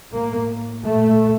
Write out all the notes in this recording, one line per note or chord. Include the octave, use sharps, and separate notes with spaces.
A2 A#3
A#2 A3